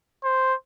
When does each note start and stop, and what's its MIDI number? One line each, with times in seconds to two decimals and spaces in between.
0.24 0.54 72